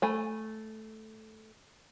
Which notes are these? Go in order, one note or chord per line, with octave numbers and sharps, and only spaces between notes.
A3 G#5 B5